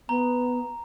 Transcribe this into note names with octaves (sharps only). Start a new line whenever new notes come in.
B3 A#5